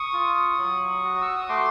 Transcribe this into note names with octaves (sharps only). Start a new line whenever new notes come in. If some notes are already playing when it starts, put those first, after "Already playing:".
Already playing: C#6 D#6
F4
F#3
F#4
E6
D#6
A3 C6 D6